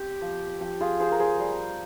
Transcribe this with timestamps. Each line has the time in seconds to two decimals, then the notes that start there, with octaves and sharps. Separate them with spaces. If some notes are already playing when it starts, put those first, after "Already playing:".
Already playing: C4 G4
0.21 F3
0.60 F3 G4
0.80 F4 G#4
1.00 F3 G#4 C5
1.12 A#4
1.19 G#4 C5
1.39 G3